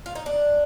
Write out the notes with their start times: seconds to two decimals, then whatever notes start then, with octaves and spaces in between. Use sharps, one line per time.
0.06 F4
0.15 D#4
0.26 D4